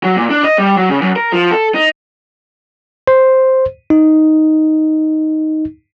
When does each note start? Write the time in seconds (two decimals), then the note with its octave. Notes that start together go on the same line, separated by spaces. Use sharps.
0.03 F#3
0.17 A#2
0.30 D4
0.44 D#5
0.58 G3
0.77 F#3
0.90 C#3
1.02 F#2
1.16 A#4
1.32 F3
1.52 A4
1.74 D#4
3.07 C5
3.90 D#4